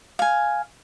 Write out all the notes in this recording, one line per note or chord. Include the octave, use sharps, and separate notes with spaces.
F5 G#5